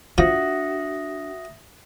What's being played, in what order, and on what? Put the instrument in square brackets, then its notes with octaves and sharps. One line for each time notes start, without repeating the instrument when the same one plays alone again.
[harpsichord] F3 [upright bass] D4 [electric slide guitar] F#4 [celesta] E5 D#6 A#6